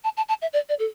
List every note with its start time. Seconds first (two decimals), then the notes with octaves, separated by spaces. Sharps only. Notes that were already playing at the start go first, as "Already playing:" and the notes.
0.04 A5
0.17 A5
0.28 A5
0.42 E5
0.53 D5
0.69 D5
0.79 A4